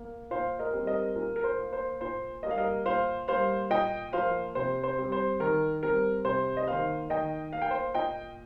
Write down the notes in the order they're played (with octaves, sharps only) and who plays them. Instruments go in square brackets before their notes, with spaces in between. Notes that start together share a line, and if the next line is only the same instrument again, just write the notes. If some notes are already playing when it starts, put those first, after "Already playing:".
Already playing: [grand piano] A#3
A#2 C5 F5
A#4 D#5
G3 C4
A#4 D#5
A#2 A#4
A#4
C5
A#3
C5
A#2 C5
G3 A#3 D#5
F5
A#4 D#5
A#2 C5 F5
G3 A#3 C5 F5
A#2 D#5 G5
F3 A#3 C5 F5
C3 C5
C5
G3 C4
C5
D#3 A#4
G3 C4 A#4
C3 C5
D#5
D#3 A#3 C5 F5
D#3 D#5 G5
A#3 F5
G5
C5 F5
A#2 D#5 G5